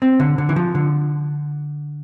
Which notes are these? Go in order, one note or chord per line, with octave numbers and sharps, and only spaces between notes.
C4
D3
D3
E3
F3
D3